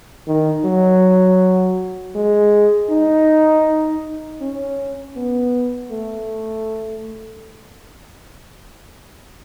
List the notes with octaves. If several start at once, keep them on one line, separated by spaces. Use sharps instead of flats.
D#3
F#3
G#3
D#4
C#4
B3
A3